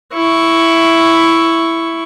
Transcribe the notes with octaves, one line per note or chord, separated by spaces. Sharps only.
E4 C#6